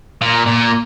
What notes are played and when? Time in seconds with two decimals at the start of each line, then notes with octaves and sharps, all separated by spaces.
0.21 A#2
0.46 A#2